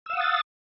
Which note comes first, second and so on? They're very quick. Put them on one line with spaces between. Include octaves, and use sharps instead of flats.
E6 F5 F#5 D#6 A6